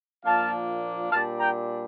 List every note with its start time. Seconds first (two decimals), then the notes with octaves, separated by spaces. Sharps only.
0.24 A#2 F3 A#3 D4 F5 A5
1.11 A#2 G3 D4 F5 A5
1.40 G5 A#5